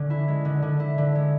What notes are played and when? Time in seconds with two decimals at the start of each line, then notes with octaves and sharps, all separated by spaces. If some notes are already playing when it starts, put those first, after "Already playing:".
Already playing: D3 C#4
0.10 E4
0.28 G#3
0.45 D3
0.62 D3
0.80 E4
0.98 D3
1.15 G#3